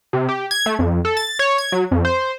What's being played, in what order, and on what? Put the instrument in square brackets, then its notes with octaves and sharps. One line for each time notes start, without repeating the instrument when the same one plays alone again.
[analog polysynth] C3
G4
G#6
A3
F2
A4
A6
C#5
G#6
F#3
F2
C5